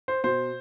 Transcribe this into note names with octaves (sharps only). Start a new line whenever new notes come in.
C5
B2 C5